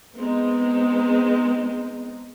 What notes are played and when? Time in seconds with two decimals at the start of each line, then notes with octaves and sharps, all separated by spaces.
0.17 G#3 B3 C4 D#4